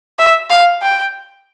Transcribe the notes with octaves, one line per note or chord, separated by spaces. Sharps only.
E5
F5
G5